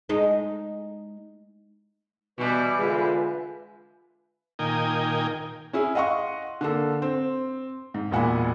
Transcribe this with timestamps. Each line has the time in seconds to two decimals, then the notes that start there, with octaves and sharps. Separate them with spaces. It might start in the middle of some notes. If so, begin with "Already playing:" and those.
0.09 G#3 D#4
2.38 B2 E3 G3 B4 E5 G#5
2.79 D3 G#3 F4
4.59 A#2 D#3 A#4 G5 G#5 D#6
5.73 C#4 E4 G#4
5.95 D#5 F5 F#5 C6 C#6
6.61 D3 A#3 A4
7.02 C4
7.94 G#2
8.11 E1 A#2 F#5 G#5 B5